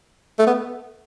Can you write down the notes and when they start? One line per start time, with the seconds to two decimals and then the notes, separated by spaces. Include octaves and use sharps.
0.39 A3
0.47 B3